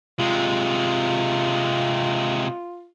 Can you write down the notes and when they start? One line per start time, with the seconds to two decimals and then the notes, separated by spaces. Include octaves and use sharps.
0.19 C3 G#3 F4